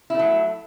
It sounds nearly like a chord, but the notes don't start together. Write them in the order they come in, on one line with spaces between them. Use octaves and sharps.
E4 A3 F#3